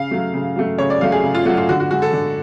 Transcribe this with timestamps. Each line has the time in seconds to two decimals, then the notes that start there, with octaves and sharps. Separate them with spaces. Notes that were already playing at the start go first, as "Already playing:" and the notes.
Already playing: C#3 F5
0.11 F#3 A3
0.34 C#3
0.56 F#3 A3
0.78 C#3 C#5
0.90 D5
1.00 F#3 A3 F5
1.12 G#4
1.24 C#3
1.35 F4
1.45 A3 F#4
1.49 F#3
1.57 F4
1.69 D3 F#4
1.80 F#4
1.91 G#3 F#4
2.02 A4
2.13 D3